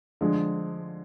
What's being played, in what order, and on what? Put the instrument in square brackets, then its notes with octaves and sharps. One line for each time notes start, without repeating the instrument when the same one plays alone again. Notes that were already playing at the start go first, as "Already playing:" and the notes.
[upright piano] D3 F3 G#3